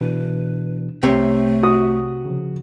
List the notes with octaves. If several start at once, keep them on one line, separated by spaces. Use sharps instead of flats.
B2 E3 D4 B4
C2 C3 A3 C4 C#5
F#4 D#6
C#3 F3